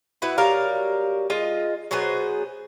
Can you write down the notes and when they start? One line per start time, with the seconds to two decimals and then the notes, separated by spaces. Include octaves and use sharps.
0.22 B3 E4 F#4 B4
0.38 F#3 G3 A#4 F5
1.30 G#3 F4 D#5
1.91 F#3 B3 G#4 C5